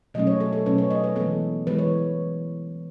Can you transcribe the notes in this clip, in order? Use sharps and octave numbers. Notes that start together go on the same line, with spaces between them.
B2 F#3 A3 C#4 D#5
C#5
A4
A4
B2 F#3 A3 C#4 B4
C#5
D#5
B4
E3 G#3 B3 A4
E3 G#3 B3 B4
C#5